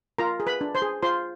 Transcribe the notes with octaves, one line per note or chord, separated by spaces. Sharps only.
F4 A#4 A#5
G#4
B4 B5
D4
C5 C6
G#4
F4 C5 C6